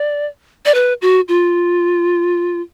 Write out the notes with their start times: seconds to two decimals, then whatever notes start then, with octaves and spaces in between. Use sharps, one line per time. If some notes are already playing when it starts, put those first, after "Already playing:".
Already playing: D5
0.65 D5
0.74 B4
1.02 F#4
1.28 F4